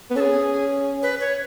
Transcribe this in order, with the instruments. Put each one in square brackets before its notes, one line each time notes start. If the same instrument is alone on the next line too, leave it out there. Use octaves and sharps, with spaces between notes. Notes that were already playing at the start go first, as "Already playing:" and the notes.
[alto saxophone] B3
[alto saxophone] C#4 [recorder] A4
[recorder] G#4
B4
C#5